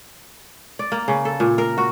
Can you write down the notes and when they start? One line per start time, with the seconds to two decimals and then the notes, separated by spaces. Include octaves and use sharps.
0.79 D5
0.92 A#3
1.08 C#3
1.25 A4
1.40 A#2
1.58 A#4
1.78 F#4